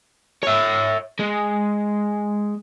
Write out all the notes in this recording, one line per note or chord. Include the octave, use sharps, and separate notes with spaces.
C#5 E5
G#3